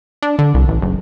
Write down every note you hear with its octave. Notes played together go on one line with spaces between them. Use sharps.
D4
D3
C2
A1
F#1